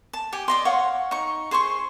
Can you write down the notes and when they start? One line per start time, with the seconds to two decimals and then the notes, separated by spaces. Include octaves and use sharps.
0.13 A5
0.33 G4 G#5
0.48 D5 D#5 C6
0.65 C#5 F5 F#5 C#6
1.11 D#4 C#6
1.51 G#4 C5 C6 C#6